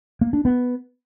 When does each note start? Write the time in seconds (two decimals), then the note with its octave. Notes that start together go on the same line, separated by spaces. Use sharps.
0.21 A#3
0.33 D4
0.45 B3